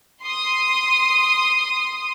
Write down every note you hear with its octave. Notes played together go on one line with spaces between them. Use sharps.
C6 D#6